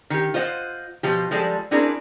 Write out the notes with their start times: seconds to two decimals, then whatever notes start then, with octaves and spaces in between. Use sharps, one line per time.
0.10 D#3 G4
0.34 F4 C5 D#5 F5 F#5
1.03 B2 F3 G4
1.31 F3 G3 G#3 A4
1.71 B3 C4 D4 E4 G#4 A#4